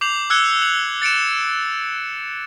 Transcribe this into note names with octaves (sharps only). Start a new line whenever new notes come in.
D6 G6 C7 F7 F#7
E6 F#6 G#6 C#7 G7
C#7 F7 F#7
A6 C#7 D7 E7